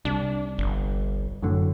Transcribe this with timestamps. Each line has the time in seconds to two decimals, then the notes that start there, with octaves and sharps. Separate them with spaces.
0.05 C2 D4
0.58 G1
1.42 F#2 A2 D3